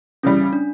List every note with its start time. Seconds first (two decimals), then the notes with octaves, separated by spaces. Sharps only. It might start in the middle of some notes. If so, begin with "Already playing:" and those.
0.23 C#3 E3 G3 C#4
0.53 D4